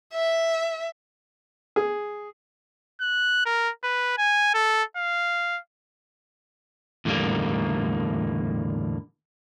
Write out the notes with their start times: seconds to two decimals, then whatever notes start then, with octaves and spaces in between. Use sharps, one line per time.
0.13 E5
1.76 G#4
3.01 F#6
3.46 A#4
3.84 B4
4.18 G#5
4.54 A4
4.97 F5
7.05 E2 A2 D3 F#3 G3 A#3